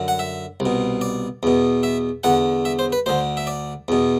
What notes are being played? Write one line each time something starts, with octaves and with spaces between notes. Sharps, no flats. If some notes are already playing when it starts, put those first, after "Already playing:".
Already playing: F#2 D3
F#5
E5
C2
B2
D5
E2 B2
E5
E2 D3 F#5
E5
C5
B4
D2 D3 C5
E5
D5
E2 B2